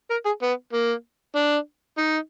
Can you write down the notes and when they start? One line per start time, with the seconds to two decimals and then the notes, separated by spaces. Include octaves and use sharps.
0.10 A#4
0.25 G#4
0.42 B3
0.73 A#3
1.36 D4
1.98 D#4